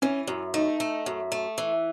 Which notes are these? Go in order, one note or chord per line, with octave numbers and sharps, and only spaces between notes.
E3 C#4
F#2
A3 D#4
A3
F#2
A3
E3